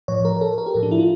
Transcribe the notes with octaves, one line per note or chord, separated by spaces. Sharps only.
A2 F3 C#5
A#4
A#4
A4
A#4
G4
A2 F3 A4
D4
E4
F4